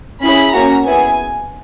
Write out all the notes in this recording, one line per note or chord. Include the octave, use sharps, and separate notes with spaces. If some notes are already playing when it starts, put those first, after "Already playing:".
C#4 E4 G#4 B5
A#3 C#4 F#4 A#5
B3 E4 G#4 G#5